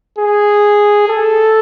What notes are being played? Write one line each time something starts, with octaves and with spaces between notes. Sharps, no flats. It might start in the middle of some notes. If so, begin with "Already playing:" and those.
G#4
A4